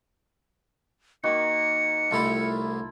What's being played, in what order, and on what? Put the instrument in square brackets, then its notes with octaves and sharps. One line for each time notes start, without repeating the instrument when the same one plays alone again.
[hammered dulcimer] D#3 A#3 F#4 [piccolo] C#7
[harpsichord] C2 A2 G4 [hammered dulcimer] E4 F4 A4